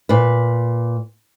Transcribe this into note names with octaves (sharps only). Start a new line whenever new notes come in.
A#2 B4